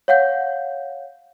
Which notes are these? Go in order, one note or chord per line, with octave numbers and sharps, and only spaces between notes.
C#5 F5 F#5 G6